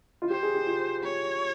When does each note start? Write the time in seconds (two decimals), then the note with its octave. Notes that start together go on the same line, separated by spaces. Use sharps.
0.22 F4
0.30 G4 C5
0.43 G#4
0.54 G4
0.66 F4
1.03 C#5